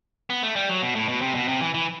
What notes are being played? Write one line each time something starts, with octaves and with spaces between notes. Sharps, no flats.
B3
A3
G3
F#3
B2
A2
B2
C3
B2
C3
E3
E3